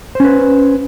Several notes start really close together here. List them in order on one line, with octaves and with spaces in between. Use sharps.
C5 C#4 B4